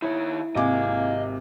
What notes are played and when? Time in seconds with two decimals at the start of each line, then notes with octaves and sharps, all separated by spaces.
0.02 D#3 E4 C#5
0.55 G#1 C3 A#3 D#5 G#5 D6